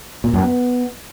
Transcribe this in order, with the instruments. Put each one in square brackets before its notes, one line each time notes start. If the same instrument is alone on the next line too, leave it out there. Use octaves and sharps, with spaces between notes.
[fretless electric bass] A#2
F#2
B3